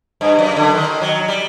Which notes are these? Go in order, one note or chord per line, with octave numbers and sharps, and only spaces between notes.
G2
F#2
D3
D#3
F#3
G3